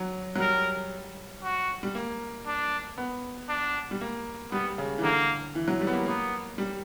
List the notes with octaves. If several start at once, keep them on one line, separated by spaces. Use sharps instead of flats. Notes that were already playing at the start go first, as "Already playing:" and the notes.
Already playing: F#3
F#3
G3 A#4
F#4
G3
A#3
D4
B3
D4
G3
A#3
G3 B3
C#3
E3
D3 A#3
E3
F#3
G3
B3
A#3
A#3 B3
G3